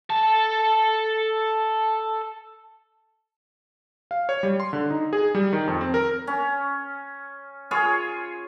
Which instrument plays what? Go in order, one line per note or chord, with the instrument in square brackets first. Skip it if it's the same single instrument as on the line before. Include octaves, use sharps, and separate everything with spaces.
[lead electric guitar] A4 A5
[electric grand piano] F5
C#5
G3
C6
D3
D#4
G#4
G3
D#3
F2
C4
A#4
[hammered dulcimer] C#4
F4 G#4 C#5